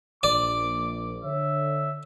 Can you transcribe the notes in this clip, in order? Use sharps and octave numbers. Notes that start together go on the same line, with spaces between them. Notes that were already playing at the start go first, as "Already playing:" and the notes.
A#1 D5 D6
D3 C#5 E5